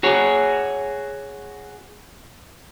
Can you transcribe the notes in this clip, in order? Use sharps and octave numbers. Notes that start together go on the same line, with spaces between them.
F#4 G#4 C#5